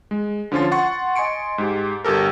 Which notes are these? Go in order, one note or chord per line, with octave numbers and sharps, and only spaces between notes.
G#3
D3 F3 C#4 F4 A6
F#5 C6 C#6 A6
D#5 G#5 C6 C#7 D7
G#2 G4
G1 G4 A4 A#4